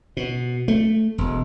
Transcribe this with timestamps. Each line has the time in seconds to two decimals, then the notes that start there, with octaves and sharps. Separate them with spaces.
0.17 B2
0.68 A3
1.18 E1